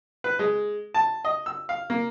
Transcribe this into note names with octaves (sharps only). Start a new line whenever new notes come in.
B4
G#3
A5
D#5
E6
F5
A#3